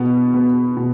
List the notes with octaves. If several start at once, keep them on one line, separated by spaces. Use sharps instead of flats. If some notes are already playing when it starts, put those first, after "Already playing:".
Already playing: B2 B3
B3
B2